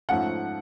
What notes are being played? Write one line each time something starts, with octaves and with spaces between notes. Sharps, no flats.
G#2 F3 A3 C#4 F#5